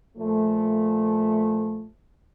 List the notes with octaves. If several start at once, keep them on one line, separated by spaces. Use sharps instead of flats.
A#2 F3 A3